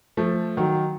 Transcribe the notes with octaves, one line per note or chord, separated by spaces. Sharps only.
F3 A3
D#3 F#3